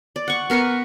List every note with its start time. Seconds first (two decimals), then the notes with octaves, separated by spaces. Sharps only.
0.16 D5
0.28 F#5 C#6
0.50 B3 A#4 B4 C#6